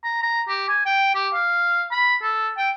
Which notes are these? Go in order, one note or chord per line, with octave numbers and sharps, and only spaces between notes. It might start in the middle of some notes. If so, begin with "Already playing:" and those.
A#5
A#5
G4
G#5
G5
G4
F5
B5
A4
G5